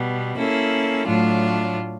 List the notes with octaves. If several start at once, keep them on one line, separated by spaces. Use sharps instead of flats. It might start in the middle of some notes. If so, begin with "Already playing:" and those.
Already playing: B2 G3 B3
A#3 C#4 E4 A4
A2 F#3 A3 D4 F4